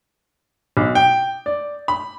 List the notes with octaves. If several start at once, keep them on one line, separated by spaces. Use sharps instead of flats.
B1
G5
D5
B5